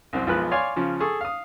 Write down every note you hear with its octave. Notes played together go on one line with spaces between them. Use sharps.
C2 F#2 C4
B1 F3 G#3 B4 F#6
C#5 D5 F5 G#5 C6
C#3 F3 C#4
G#4 A4 C#6
F5 D#6